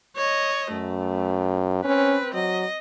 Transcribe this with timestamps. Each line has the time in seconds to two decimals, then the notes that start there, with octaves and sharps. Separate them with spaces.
0.16 C#5 D#5
0.72 F#2 A3
1.84 C4 C#4 B4
2.34 F#3 D#5